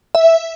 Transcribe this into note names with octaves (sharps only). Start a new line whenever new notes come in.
E5